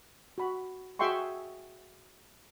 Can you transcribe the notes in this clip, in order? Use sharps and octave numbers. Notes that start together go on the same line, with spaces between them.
F#4 B5
F#4 G#4 E5 G5 C6 C#6